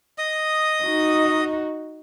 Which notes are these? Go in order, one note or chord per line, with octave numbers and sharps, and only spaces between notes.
D#5 D#6
D#4 F#4